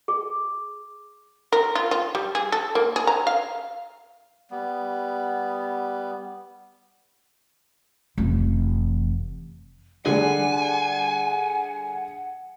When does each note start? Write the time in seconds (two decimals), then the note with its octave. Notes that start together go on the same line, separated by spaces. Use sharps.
0.08 G#4
1.52 A#4
1.75 F4
1.91 F4
2.15 G3
2.35 G#4
2.52 A4
2.75 A#3
2.96 G#4
3.07 A#5
3.27 F5
4.51 G3 B3
8.18 F1 E3
10.06 D3 G3 G#4 F#5 G#5